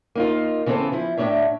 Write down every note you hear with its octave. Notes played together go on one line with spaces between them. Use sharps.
A#3 D#4 F4
C#3 E3 B3 C4 A4
F3 E4
A2 C#4 D4 C#5 E5